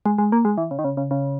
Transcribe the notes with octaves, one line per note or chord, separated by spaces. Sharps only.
G#3
G#3
A#3
G#3
E3
C#3
D#3
C#3
C#3
C#3